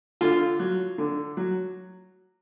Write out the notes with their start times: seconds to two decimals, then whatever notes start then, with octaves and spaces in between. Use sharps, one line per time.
0.21 D3 F4
0.59 F#3
0.98 D3
1.37 F#3